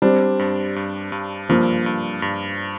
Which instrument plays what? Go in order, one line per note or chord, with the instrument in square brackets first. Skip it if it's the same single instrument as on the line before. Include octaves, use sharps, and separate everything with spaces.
[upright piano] G3 C4 [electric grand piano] D4
[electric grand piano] G2
G2
G2
[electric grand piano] G2 [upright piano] F3 A#3
[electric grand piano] G2
G2